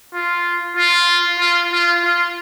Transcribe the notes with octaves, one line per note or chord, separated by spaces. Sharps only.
F4
F4
F4
F4
F4